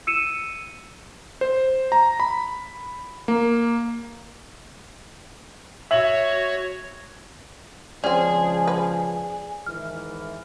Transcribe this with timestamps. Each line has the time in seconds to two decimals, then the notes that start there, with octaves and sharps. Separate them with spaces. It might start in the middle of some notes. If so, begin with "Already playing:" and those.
0.07 E6 C#7 D#7 E7
1.41 C5
1.92 A#5
2.20 B5
3.28 A#3
5.91 F#4 C#5 E5 F#7
8.04 C#2 C#3 F3 C4 C#4 G#4 D5
8.68 B4
9.66 G#2 D#3 E3 F6